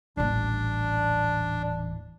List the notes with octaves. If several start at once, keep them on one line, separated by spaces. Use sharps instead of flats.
D#1 A1 D4